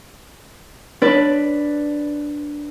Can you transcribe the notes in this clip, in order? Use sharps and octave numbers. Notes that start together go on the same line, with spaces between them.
D4 B4 D5